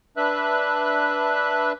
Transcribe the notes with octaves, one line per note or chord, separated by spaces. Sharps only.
D4 B4 E5 F#6